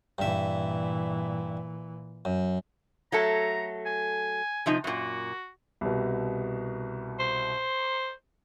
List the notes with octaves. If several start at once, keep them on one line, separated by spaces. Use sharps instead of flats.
G2 A#2 E3 E5
F#2
F#3 A3 A4 A#5
G#5
C3 F3 D#4
F#2 A#2 F#4
C2 B2
C5